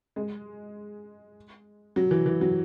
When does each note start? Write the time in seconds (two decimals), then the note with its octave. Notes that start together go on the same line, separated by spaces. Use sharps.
0.16 G#3
1.96 F#3
2.11 E3
2.26 E3
2.41 F#3